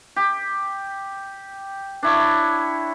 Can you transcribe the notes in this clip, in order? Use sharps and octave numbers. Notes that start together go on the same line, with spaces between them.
G4
D4 E4 C#5